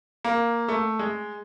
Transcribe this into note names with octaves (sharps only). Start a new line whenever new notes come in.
A#3
A3
G#3